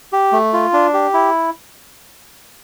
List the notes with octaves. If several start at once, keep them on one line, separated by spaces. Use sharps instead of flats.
G4
A3
F4
D4
G4
E4